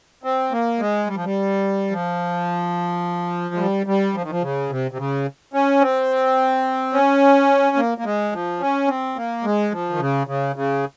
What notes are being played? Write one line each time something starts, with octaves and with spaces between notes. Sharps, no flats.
C4
A#3
G#3
G3
F3
G3
F3
G#3
G3
G3
F3
D#3
F3
C#3
C3
C3
C#3
C#4
C4
C#4
A#3
A#3
G#3
F3
C#4
C4
A#3
G#3
F3
D#3
C#3
C#3
C#3